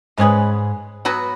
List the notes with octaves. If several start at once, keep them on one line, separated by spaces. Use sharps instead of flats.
G#2 G#3 C#4 G#4 B4
F#3 B3 F#4 B4